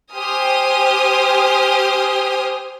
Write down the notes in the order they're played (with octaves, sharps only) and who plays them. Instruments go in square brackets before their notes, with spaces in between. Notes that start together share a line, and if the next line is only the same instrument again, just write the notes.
[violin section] G4 C5 G#5 D#6 F6